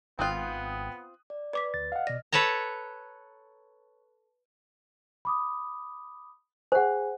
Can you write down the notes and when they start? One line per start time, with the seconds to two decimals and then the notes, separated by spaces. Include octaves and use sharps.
0.19 G#1 B3 C4 F4 G5 D#6 F#6
1.30 D5
1.53 B4 D5 D6 B6
1.74 D2 A6
1.92 D#5 F5 F#5 F6
2.07 B2 D5 A#6
2.32 A4 B4 C#5 A5 A#5
5.25 B5 D6 D#6
6.72 G#4 C5 F#5 G#5